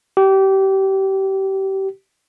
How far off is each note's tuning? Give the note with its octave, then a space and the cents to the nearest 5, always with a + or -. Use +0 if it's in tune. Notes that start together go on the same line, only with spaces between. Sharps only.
G4 -25